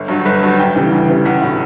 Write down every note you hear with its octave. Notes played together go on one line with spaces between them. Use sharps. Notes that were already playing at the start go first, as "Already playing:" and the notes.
Already playing: G1
G2 F#3
G1 B4
G2 F#3
D2 G5
C#3 E3 G3 G5
D2
C#3 E3 G3
B1 F#5
A2 F#3